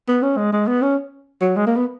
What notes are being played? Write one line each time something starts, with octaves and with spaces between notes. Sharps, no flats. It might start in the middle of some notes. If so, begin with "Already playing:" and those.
B3
C#4
G#3
G#3
B3
C#4
F#3
G#3
A#3
B3